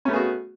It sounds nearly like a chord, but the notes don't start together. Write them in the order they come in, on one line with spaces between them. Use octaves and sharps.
C#4 A3 B3 G#4 F#4